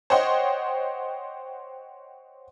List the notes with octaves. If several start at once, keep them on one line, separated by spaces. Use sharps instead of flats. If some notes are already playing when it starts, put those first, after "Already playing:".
C5 C#5 D#5 F#5 G5 C6